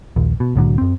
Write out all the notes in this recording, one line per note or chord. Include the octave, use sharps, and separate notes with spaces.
A#1 D#2
B2
C2 A2 D3 F#3
F#2 C4